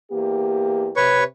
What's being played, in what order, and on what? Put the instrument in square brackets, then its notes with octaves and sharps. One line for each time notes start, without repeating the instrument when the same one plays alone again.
[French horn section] E2 A#3 G4
[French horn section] C3 [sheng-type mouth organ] B4 C#5 C#6